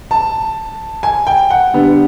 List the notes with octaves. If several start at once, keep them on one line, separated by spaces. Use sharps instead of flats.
A5
G#5
G5
F#5
D3 G3 B3